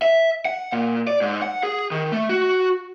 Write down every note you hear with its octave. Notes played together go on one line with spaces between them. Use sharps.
E5
F#5
A#2
D5
G#2
F#5
G#4
D#3
A3
F#4